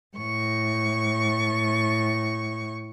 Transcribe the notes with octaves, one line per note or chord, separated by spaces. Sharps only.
A2 C#6